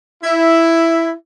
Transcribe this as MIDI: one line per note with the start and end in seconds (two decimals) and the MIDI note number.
0.24 1.11 64